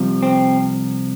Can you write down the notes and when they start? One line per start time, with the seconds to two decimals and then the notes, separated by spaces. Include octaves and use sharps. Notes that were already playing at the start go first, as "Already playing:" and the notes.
Already playing: C2 C3 F3
0.23 C4